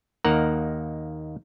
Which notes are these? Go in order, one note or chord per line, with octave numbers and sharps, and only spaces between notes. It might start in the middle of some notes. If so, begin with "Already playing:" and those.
D#2 A#3 D#4 A#4 F#5